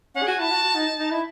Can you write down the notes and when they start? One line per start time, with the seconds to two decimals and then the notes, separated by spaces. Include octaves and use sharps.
0.15 C#4 F#5
0.22 G#4
0.27 F#4 G#5
0.39 E4 A5
0.51 F#4
0.63 F#4
0.75 D#4
0.99 D#4
1.10 E4